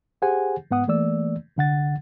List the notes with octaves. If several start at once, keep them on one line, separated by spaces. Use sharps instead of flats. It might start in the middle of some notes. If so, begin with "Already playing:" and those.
G4 G#4 C5 F#5 G#5
G#2 B3 F#5 D#6
E3 A3 A#3 D5 E6
C2 D3 F#5 A6